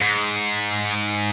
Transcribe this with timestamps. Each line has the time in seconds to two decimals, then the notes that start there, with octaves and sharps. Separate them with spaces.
0.01 G#2